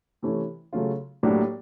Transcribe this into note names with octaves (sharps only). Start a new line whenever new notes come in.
C3 E3 A3 C#4
C#3 F#3 A3 C#4 F4
A2 F#3 A#3 D4 G4